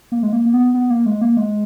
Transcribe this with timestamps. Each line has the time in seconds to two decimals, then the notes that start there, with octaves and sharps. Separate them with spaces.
0.12 A#3
0.23 G#3
0.33 A#3
0.45 A#3
0.53 B3
0.74 B3
0.90 A#3
1.06 G#3
1.21 A#3
1.37 G#3